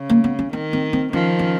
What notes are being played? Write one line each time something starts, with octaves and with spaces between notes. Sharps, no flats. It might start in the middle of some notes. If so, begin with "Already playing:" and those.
Already playing: C#3
A#3
B3
C#4
D#3 C4
C4
C4
D#3 F3 C#4
C#4